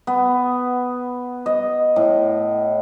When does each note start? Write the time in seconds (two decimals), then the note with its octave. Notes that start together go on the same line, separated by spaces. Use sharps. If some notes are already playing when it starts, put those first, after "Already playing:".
0.07 B3
1.46 D#5
1.96 A2